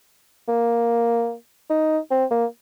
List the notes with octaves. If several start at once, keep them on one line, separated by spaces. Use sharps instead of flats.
A#3
D#4
C4
A#3